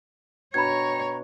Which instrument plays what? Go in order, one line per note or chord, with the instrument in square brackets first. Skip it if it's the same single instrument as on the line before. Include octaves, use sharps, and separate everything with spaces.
[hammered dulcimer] B2 D4 [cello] C#5 [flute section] G5 A#5 C#6 [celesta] B5 G#6